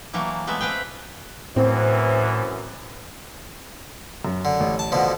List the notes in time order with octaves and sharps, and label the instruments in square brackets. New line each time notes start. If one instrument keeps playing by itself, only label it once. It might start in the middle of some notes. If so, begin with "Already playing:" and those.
[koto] E3 F#3 A3 A#3
G#3 A3 B3 E5
C4 B4 F5 G5
[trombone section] F#2 E3 [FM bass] A2 [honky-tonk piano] C4
[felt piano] F#2
[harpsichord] D3
[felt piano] A1
[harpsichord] A5
B2 D3 F3